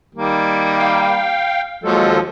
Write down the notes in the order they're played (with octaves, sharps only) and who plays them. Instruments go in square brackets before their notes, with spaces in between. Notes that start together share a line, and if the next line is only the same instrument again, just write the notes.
[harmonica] D#3 G3 A#3
[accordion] F5 G5
[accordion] D#2 G#3 A4 [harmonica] F3 F#3